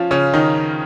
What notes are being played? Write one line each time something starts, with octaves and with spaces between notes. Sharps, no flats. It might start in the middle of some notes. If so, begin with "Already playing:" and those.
Already playing: F3 C#4 F4
C#3 C#4
D#3 D#4